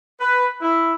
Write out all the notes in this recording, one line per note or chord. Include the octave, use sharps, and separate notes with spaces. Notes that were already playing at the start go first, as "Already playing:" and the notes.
B4
E4